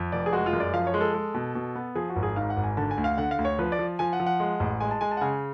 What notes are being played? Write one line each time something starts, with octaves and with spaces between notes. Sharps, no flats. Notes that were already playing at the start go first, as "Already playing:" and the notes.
Already playing: F2
F1 D5
G#4
G#3 F#4
F4
F#2
D5
F3 F5
C#5
G#3
A4
G#3
B2
B2
B3
F3 G#4
F#4
G#1
G#4
G#2 F5
F#5
G#1
G#5
D3 A5
G#5
D2
F5
D3 F#5
F5
D2
C#5
F3 B4
D5
F3
F3 G#5
F#5
F3
F#5
G#3
A1
G#3 G#5
A5
G#3 G#5
A5
F#5
C#3 G#5